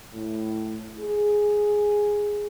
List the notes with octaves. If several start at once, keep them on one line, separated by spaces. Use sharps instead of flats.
A2
G#4